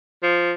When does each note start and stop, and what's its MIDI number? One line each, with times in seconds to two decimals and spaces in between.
0.23 0.52 53